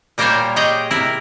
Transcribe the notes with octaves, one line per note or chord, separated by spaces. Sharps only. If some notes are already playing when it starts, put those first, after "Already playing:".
A#2 G3 A#3 F4 C5 C#5
G4 G#4 C#5 D#5 G5
C3 E4 A#4